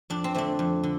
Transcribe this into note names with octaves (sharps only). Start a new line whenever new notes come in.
F2 D4
C4
D3 A3 C4 D4
F2
D3